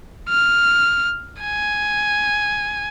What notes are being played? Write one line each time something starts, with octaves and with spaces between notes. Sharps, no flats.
F6
G#5